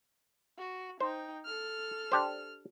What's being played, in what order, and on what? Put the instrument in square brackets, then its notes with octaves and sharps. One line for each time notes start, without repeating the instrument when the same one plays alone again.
[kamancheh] F#4
[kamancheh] D#4 G5 [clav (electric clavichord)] C5
[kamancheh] A4 F6
[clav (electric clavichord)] D4 G4 C5